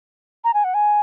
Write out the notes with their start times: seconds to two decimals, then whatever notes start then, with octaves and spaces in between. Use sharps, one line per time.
0.44 A#5
0.54 G#5
0.64 F#5
0.74 G#5